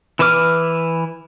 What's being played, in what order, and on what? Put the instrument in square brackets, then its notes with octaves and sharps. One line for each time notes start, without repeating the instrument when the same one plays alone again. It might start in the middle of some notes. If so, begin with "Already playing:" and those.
[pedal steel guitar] E3 E4 B4 D6 F6